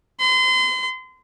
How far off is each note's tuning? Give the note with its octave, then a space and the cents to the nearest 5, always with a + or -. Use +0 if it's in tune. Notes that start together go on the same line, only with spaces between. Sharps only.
C6 -35